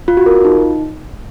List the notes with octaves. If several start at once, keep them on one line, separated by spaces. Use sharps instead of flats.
F4
F#4
A#4
F4
D#4